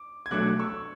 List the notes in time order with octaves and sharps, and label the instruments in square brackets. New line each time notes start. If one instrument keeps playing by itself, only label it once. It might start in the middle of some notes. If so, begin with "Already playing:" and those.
Already playing: [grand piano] D6
G#6
[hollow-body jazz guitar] B2 F#3 A3 D4 [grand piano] D6 F#6
[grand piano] C#6 E6